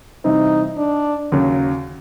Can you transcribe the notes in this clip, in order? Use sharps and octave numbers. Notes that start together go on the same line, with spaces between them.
C3 E3 G3 C4 D#4
D4
D#2 C#3 F#3